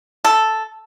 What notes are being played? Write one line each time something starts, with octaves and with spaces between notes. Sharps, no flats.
A4